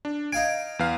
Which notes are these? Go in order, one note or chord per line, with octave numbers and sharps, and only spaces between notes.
D4
D#4 F5 G#5 D7
E2 B4 F5